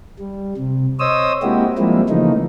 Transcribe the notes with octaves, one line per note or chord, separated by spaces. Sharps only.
G3
C3
C5 C#5 D#5 D#6 E6
G#3 A#3 C4 E4 F#4 G4
F3 G3 G#3 A#3 C4 E4
C#3 E3 F3 A3 A#3 D#4